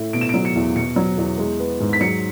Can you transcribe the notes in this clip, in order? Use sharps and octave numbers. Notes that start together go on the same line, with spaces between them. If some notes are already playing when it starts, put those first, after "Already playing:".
Already playing: A2
B2 D7
E7
F#3 D7
C#7
E2
B2 C#7
F#3
E2
G#3
B3
G#2
B6
F#3 C#7